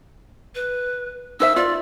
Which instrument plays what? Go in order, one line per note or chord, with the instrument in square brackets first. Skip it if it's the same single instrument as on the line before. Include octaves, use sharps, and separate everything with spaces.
[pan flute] B4
[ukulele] D#4 C5 E5 [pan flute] E6
[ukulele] F4 [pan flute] D5